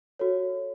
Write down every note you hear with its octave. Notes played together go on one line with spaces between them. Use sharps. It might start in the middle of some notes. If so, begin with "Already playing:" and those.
F#4 A4 C#5